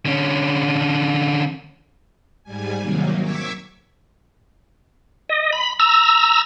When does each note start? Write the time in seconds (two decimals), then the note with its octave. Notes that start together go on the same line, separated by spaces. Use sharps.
0.06 D3 C#4
2.44 G#2 G3 G#5
2.80 C3 D#3 F#3 A#3
3.20 C#6 D6 E6 G#6 B6
5.29 D#5
5.52 B5
5.79 A#5 E6